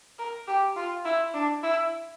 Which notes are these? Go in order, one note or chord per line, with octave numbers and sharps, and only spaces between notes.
A#4
G4
F4
E4
D4
E4